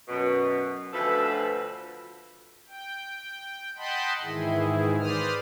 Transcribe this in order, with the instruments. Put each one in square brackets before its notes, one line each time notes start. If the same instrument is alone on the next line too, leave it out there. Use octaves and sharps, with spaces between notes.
[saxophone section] F#2 B2
D2 B2 F3 A4 B4 E5
[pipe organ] G5
D#5 F#5 G5 A5 B5 C6
G#2 D#3 E3 E4 G#4
B4 C5 D5 D#6 F6